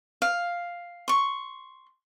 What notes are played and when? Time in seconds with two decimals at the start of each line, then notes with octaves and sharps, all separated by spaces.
0.22 F5
1.08 C6 C#6